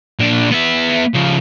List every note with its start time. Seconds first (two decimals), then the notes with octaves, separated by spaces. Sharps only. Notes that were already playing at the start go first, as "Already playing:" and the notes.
0.20 A#2 D4
0.51 B3 E5
1.14 C#3 F3